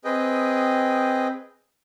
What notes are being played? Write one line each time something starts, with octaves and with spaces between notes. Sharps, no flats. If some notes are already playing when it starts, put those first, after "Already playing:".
C4 G#4 B4 D#5 G5